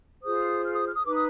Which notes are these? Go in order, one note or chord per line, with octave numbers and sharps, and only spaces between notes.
F4 G#4 C5 D#6
F6
D#6
F6
D#6
D#4 B4 D6
D#6